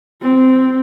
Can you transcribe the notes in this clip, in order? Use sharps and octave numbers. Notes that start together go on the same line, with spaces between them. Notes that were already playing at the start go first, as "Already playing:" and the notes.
C4